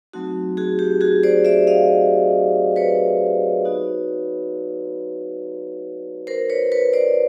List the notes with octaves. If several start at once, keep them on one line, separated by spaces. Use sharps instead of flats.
F#3 A3 C4 D#4 F#4
F#4 G#4
G4
F#4 G#4
C5 D5
D5 E5
D#5 F5
B4 C#5
B3 D#4 F#4
A#4 C5
B4 C#5
B4 C#5
C5 D5